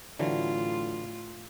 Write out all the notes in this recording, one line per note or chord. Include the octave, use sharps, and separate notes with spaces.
A2 D3 E3 F#3 F4